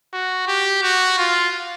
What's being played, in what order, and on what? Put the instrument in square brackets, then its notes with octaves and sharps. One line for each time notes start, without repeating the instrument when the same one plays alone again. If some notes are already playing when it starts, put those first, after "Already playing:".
[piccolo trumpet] F#4
G4
F#4
F4